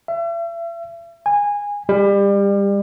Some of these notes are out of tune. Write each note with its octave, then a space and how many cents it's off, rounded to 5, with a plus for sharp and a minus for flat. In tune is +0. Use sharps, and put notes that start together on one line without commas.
E5 +40
G#5 -20
G3 +30